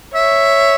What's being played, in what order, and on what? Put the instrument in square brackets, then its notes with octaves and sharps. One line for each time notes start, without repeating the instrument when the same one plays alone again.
[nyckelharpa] C#5 [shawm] E5